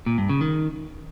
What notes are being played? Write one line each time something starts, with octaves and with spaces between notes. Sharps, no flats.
A#2
G2
C#3
D#3